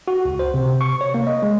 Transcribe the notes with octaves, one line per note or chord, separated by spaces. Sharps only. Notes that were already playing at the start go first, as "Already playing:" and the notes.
F#4
C#2
C5
C3
C#6
C#5
A#3
D#5
G#3